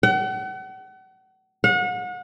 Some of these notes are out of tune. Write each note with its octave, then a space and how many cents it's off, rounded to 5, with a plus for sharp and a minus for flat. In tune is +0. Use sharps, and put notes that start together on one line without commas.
F#5 +40
F#5 -35